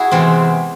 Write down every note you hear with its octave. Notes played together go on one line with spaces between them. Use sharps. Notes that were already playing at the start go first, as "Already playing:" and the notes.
Already playing: E4 F#4 G#4
E2 C3 E3 G#3 C4